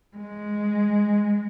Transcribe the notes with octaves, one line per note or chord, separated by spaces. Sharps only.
G#3